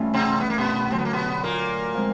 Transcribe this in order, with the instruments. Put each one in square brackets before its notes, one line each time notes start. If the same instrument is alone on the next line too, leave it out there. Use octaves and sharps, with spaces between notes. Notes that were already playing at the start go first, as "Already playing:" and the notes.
Already playing: [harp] G2 E3 A3 C#4 F4
[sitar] C3 C4
B3
A#3
B2 B3
[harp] D2 D3 F#3 [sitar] C4
[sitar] B3
A#3
B2 B3
A#2 A#3
[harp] F3 G#3 C4